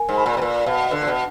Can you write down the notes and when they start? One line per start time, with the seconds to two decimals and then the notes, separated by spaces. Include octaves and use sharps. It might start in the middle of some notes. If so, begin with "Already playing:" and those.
Already playing: A#4 G#5
0.09 G#2
0.17 B5
0.26 A#2
0.37 B2
0.42 A#2 B4
0.66 B2 F5
0.91 D3 B4
1.01 A#2
1.07 B2